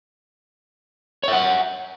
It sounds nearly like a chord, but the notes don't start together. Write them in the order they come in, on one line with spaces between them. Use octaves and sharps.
C#5 E5 F#5